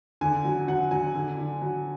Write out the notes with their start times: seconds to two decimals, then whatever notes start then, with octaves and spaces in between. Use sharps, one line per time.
0.21 D3 G#5
0.45 F#3
0.68 F#3 F#5
0.91 F#3 G#5
1.15 D3
1.38 D3
1.62 F#3